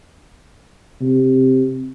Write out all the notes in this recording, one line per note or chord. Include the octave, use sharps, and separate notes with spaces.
C3